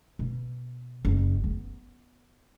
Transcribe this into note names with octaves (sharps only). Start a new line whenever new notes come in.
B2
F#1
B3